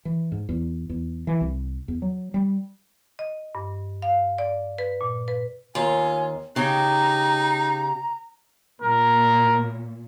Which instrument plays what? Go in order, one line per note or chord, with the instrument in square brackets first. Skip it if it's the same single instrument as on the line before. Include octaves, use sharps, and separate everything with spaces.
[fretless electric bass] E3
G#2
E2
E2
E3
C2
E2
F#3
G3
[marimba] D#5
G2
F5
D5
B4
A#2
B4
[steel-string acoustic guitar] D#2 [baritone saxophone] F4 [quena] G#5
[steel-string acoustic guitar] C#3 G4 [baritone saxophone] D#4 [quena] A#5
[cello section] A#2 [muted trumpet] A#4